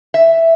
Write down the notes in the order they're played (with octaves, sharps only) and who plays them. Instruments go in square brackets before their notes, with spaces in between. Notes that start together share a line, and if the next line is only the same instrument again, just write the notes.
[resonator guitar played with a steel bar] E5